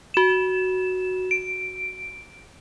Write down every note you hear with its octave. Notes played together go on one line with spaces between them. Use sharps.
F#4 E7
D7